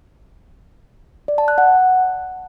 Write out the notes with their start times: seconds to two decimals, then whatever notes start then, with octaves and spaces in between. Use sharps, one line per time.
1.28 D5
1.38 A5
1.48 F#6
1.58 F#5